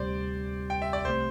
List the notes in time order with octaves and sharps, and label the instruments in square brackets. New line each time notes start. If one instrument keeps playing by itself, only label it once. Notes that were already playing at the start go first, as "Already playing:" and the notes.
Already playing: [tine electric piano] D2 C3 G3 C4 G4 [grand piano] C5 D5
[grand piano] G5
E5
D5
[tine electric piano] C2 C3 A3 [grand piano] C5